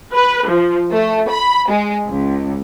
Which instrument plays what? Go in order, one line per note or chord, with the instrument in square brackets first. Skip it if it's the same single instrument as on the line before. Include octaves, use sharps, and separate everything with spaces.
[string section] B4
F3
A3
B5
G#3
C#2